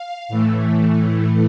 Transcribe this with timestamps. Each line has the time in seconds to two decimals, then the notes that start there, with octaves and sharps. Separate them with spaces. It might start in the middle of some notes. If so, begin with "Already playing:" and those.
Already playing: F5
0.28 A2 E3 A3